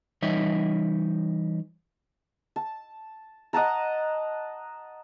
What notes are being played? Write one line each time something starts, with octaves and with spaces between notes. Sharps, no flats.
E3 G3 D#4 C#5 D#5 E5
A5
D#5 F#5 A5 A#5